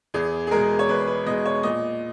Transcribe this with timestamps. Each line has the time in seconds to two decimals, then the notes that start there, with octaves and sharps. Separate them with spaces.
0.14 E2 G#4
0.47 G#4
0.51 B2 G#3 A#4
0.79 C#5
0.89 E2 B4
1.07 B4
1.26 B2 G#3 D#5
1.45 C#5
1.63 A#2 D#5